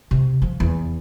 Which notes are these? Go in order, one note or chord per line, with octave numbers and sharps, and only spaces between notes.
C3
F3
E2